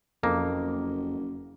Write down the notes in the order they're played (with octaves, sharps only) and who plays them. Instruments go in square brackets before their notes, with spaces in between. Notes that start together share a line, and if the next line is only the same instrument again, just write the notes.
[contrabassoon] F#1 [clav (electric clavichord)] F2 A#3